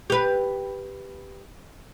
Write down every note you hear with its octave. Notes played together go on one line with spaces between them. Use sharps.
G4 B4